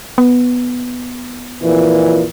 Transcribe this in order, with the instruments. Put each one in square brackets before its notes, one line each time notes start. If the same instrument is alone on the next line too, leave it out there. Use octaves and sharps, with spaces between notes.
[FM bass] B3
[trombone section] F2 A#2 E3